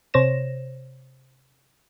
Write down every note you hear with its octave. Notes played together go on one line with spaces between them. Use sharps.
C3 C5 C#5 A#6 E7